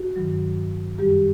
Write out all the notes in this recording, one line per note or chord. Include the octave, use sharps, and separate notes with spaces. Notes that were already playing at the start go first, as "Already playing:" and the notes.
Already playing: F#4
G2 D#3 F#3
F#2 D#3 G3 G4